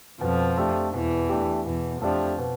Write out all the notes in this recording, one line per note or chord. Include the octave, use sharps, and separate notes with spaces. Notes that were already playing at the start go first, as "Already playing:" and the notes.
F2 B2 F3
A3 D4 G4
E2 B2 E3
A3 D4 G4
E2 B2 E3
F2 F3 A3 D4 G4
B2